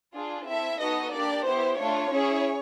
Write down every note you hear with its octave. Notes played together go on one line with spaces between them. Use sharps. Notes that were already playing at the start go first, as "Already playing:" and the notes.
D4 F4 G#4
C4 E4 A4 E5
B3 D#4 F#4 A4 D#5
A#3 D4 G4 D5
B3 E4 G4 C5
A3 D4 F4 C#5
C#4 E4 G#4